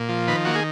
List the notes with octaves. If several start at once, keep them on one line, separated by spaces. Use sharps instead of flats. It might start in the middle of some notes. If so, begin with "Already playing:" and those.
Already playing: A#2
F3
D#3 B4
A#3 F#4
G#4